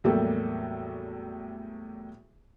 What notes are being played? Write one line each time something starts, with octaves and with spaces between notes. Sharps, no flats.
E2 A2 F#3 G3 A#3 A4